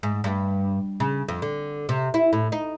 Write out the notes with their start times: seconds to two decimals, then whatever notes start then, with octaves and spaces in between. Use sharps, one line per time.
0.03 G#2
0.24 G2
1.00 C#3
1.28 F2
1.42 D3
1.89 C3
2.14 E4
2.33 A2
2.52 D#4